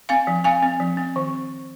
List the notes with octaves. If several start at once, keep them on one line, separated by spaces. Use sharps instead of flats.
C4 F5 G#5
F3
C4 F5 G#5
C4
F3
C4
D#3